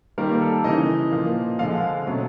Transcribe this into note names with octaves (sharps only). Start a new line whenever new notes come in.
D#3 G3 A#3 A#4
A4
C#3 E3 G#3 D#4 D#5
A#2 F3 A#3
D3 F3 G#3 F4 F5
B2 F#3 A3